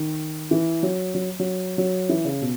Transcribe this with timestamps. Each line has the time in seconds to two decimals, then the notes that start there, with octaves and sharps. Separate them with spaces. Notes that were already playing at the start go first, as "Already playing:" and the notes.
Already playing: D#3
0.51 E3
0.83 F#3
1.15 F#3
1.39 F#3
1.78 F#3
2.09 E3
2.25 C#3
2.42 B2